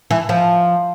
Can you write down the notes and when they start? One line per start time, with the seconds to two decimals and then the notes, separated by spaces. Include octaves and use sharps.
0.11 E3
0.29 F3